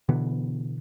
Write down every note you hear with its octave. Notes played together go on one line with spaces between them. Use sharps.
B2 D3 E3 B3